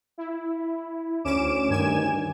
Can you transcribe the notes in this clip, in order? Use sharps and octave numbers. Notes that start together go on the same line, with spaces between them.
E4
D2 C#4 D6 D7 E7
D2 G2 D#3 G#5 G#6 E7